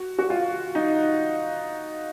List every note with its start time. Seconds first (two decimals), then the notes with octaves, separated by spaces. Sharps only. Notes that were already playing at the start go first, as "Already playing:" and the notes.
Already playing: F#4
0.19 F#4
0.30 F4
0.75 D#4